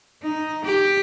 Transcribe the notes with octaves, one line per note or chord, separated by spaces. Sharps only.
D#4
G4